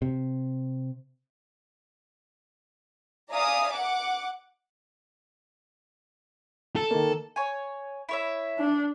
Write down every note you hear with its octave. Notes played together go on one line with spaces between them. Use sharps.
C3
D5 E5 F5 G#5 A#5 D#6
F#5 D6
A4
D#3 A#3
C#5 G#5
E4 C#5 E5
D4